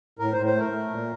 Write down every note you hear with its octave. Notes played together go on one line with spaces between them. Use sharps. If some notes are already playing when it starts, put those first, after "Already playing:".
A2 A#4
A2 C5
C5
A3 A#4
A3
A#2